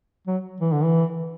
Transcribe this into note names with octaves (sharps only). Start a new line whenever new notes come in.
F#3
E3
D3
E3